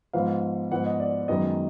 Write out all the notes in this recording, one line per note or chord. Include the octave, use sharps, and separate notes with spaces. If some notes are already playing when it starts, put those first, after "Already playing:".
G#2 F3 B3 F5
G#2 F3 B3 F#5
D#5
D5
F#2 D#3 G#3 B3 D#5